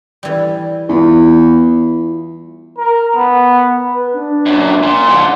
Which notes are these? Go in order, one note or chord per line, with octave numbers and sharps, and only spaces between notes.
E3 G3
E2 E4 F4
A#4
B3
B4
D4
F#2 A#2
A#2 C6
D#2 D3